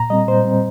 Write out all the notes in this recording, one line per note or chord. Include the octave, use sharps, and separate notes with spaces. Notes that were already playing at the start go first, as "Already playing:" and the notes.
Already playing: A#2 A#5
G3 C4 D#5
A#2 C5
G3 C4